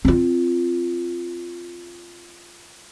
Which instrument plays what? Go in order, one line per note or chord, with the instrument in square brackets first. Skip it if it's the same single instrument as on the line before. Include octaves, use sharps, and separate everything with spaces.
[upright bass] C4 F4